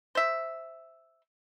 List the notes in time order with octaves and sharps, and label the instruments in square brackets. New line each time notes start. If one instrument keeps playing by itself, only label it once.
[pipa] C5 E5